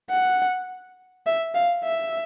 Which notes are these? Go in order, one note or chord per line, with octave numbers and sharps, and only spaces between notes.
F#5
E5
F5
E5